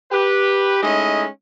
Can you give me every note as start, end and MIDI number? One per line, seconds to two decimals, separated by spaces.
0.11 0.82 67
0.11 0.82 71
0.83 1.26 56
0.83 1.26 57
0.83 1.26 61
0.83 1.26 63
0.83 1.26 64
0.83 1.26 75